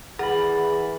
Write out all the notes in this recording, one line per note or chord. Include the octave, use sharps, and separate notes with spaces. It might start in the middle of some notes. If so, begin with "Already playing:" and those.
E3 G#4 A#4 D5 F#5 B5